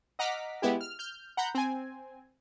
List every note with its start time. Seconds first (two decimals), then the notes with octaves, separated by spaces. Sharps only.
0.19 D#5 F#5 A#5 D6 F6 B6
0.62 G#3 B3 E4 G4
0.81 F6
0.99 F6 G6
1.37 F#5 A#5 B5 G6
1.55 C4 G#5